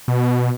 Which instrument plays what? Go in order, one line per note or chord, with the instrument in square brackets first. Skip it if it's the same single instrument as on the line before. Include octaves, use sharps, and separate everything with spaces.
[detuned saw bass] B2